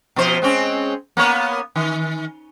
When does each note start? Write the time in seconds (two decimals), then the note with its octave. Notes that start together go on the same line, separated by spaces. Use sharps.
0.16 B2 F3 C5
0.42 G#3 C4 C#4
1.17 A#3 B3 C#5
1.76 D#3